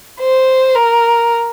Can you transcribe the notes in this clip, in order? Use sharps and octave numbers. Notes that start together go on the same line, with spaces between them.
C5
A#4